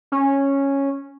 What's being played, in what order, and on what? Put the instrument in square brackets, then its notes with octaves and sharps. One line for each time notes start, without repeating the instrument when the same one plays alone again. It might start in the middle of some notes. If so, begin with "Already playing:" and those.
[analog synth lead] C#4